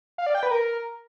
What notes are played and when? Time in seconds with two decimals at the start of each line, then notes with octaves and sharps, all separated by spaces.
0.18 F5
0.26 D5
0.35 G5
0.43 B4
0.51 A#4